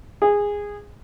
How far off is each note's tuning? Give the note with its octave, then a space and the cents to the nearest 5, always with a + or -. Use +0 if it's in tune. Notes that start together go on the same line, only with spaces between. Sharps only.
G#4 -15